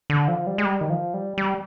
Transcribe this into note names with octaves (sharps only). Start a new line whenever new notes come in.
D3
F3
G3
G#3
G3
D#3
F3
G3
G3